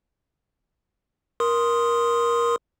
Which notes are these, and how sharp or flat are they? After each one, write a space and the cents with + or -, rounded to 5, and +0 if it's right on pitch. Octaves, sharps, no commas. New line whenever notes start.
A#4 +15 C6 +0 D#6 +0